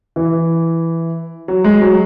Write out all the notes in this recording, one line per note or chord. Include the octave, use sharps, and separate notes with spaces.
E3
F#3
G#3
F#3